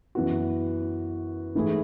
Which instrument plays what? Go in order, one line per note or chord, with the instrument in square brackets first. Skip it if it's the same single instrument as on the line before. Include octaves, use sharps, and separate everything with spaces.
[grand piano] F#2 E3 B3 F#4
G#2 E3 A3 E4 G#4